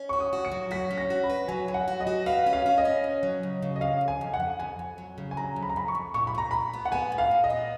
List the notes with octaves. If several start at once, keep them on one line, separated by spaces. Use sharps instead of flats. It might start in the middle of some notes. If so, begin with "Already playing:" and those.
Already playing: C#4
F#4 C#6
D#6
F#4
C#7
F#3
F#4 B6
C#4
A#6
F#4
B5
B4
F#3 G#5
F#3 G#5
F#5
F#4
D#5
F#4
B4 F5
C#4
F5
C#4
D#5
C#4
C#3
F#3
C#3
C#3
D#5
F2 F5
F2
G#5
F2
F#5
F2
F2 G#5
F2
F#3
C#3
G#5
F#3 A#5
F2
B5
A#5
F2 B5
C#6
F2
A#2 C#6
B5
A#2 A#5
A#2 B5
B3
F#5
B3 G#5
A#2
F5
A#2
D#5
B3